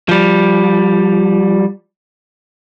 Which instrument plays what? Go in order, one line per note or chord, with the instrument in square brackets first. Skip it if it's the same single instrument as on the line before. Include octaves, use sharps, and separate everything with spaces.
[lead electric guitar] F3 G3